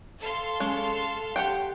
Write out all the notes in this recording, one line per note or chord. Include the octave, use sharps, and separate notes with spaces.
A4 F5 C6
G#3 C#4
G4 F#5 G5